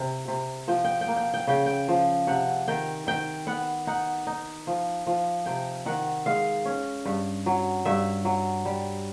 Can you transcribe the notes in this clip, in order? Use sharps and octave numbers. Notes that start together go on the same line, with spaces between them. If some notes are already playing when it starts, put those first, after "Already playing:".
Already playing: C3
C3
F3 G5
G5
G5
A#3
G5
G5
C#3 G5
G5
F3
C3 F#5
D#3 G5
D#3 G5
B3 F#5
D#4 F#5
D#4
F3
F3
C3 G5
D#3 F#5
G#3 F5
C#4
G2
F#3
G2 E5
F#3
G3